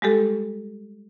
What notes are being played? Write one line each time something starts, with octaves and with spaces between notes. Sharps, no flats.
G3 G#3 G4 A4